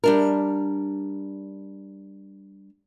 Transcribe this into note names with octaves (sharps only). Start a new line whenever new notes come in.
G3 D4 A#4